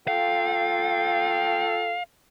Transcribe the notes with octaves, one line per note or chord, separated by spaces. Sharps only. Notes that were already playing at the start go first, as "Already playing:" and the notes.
F4 A4 F5 G5